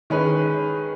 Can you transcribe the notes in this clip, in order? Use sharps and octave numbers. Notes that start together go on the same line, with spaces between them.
D#3 G#3 C#4 B4